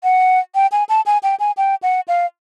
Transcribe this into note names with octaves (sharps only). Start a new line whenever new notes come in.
F#5
G5
G#5
A5
G#5
G5
G#5
G5
F#5
F5